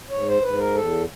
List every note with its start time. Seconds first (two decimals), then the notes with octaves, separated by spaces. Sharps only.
0.10 G#2 C#5
0.26 C5
0.42 G#2 B4
0.59 A#4
0.74 E2 A4